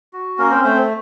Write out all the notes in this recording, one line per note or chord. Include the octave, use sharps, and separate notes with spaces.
F#4
A#3 C#4 A#4
C4 C5
A3 C4 C5